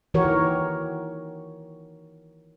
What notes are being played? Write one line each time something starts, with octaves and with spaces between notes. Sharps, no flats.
D#3 E3 F#4 G4 A#4 C#5